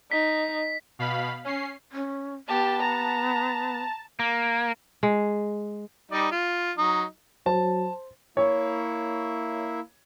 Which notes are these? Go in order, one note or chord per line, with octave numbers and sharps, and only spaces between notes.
D#4 B6
B2 F5 B5
C#4 C7
C#4
B3 G4 A5
A#5
A#3
G#3
G3 D#4 D5
F4
F#3 D#4
F#3 C5 A5
A#3 E4 C#5 E5